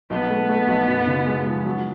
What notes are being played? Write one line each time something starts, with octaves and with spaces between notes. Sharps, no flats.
B1 B3
A3
A3
B1
F#2
C#3
G#3
F3
F#3